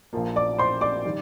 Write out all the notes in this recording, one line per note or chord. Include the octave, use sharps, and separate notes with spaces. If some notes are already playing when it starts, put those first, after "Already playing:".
A#1 A#2 F3 A#3
D5 D6
C5 C6
D5 D6
D#3 G3